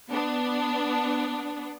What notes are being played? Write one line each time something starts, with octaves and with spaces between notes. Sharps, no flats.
B3 D4